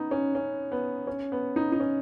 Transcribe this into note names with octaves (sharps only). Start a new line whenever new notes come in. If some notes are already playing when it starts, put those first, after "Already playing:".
Already playing: B3 D#4
C#4
C#4
B3
C#4
B3
D#4
D#4
C#4